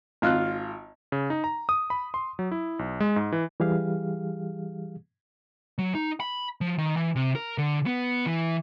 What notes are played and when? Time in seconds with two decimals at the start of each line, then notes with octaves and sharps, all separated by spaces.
0.22 G#1 F4 F6 F#6
1.12 C#3
1.30 D#4
1.44 A#5
1.69 D#6
1.90 B5
2.14 C6
2.39 F#3
2.51 E4
2.79 B1
3.00 G#3
3.16 G#2
3.32 E3
3.60 E3 G3 G4 G#4 F5
5.78 F#3
5.95 D#4
6.20 B5
6.61 F3
6.78 D#3
6.97 E3
7.16 C3
7.35 A#4
7.58 D3
7.86 B3
8.26 E3